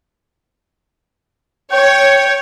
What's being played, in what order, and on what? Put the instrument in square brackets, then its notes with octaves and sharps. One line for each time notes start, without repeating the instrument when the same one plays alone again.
[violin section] C#5 [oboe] G5